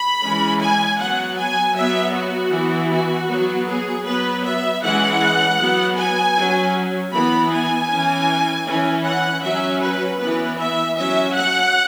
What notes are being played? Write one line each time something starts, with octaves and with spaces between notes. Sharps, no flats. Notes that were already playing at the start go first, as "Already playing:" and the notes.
Already playing: B5
E3 G#3 C#4
G#5
F#3 B3 F#5
G#5
F#3 B3 E5
F#4
E3 B3
F#4
F#3 B3
G#4
F#3 B3 B4
E5
E3 G#3 C#4 F#5
F#3 B3
G#5
F#3 C#4
E3 B3 B5
G#5
C#4
E3
E3 C#4
F#5
F#3 C#4 E5
B4
E3 B3 B4
E5
F#3 C#4 E5
F#5